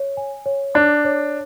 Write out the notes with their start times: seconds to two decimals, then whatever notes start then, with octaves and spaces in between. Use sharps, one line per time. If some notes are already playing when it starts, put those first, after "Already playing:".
Already playing: C#5
0.17 G#5
0.46 C#5
0.74 D4 D6
1.04 C#5